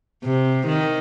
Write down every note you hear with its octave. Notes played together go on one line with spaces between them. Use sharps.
C3
D#3